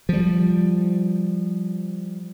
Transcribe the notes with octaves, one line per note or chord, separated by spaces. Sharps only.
F3 G3